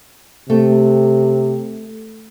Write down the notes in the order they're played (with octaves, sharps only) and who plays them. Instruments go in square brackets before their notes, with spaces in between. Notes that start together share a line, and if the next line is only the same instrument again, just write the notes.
[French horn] C3 [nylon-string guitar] A3